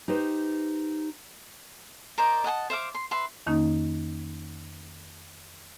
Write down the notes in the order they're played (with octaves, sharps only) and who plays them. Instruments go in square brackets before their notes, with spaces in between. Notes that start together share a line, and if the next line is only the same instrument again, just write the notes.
[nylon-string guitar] D#4 G4 B4 C5
[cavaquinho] A#4 C5 D5 D#5
D#5 F#5 G#5 A5
C5 E5 F5 D6
C6
B4 E5 C6
[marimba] F2 D#3 A#3 C#4 D#4